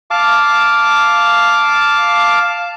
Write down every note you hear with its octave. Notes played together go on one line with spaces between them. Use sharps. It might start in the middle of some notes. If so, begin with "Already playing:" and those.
F5 A5 D6